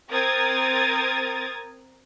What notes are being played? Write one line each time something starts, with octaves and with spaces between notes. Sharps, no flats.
C4 A#4 D#6 G#6 A6